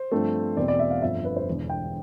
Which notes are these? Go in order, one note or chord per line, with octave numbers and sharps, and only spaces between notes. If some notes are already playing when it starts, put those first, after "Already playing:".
Already playing: C5
G2 F3 A3 C4
E2 B2 A3 C4 D5
D5
E5
F5
G1 F2 D3 E5
B4
C5
E1 E2 D3
G5